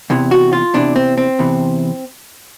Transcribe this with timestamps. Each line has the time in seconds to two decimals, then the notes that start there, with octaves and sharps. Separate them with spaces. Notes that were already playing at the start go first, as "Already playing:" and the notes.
0.10 E2 C3 E3
0.31 F#4
0.53 F4
0.74 E2 C3 E3 D4
0.96 C4
1.18 C4
1.39 E2 C3 E3